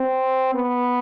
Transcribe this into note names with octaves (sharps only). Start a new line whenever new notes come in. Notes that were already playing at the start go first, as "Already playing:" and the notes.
Already playing: C4
B3